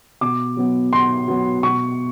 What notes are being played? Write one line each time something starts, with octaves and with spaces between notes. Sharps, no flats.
B2 D6
F#3 B3
B2 C6
F#3 B3
B2 C#6